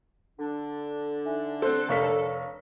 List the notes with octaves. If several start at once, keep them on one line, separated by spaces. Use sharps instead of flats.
D3 D4
D#4 E5 G#5
C4 A4 C5 C6 F#6
F1 A#4 C#5 F5 C#6 B6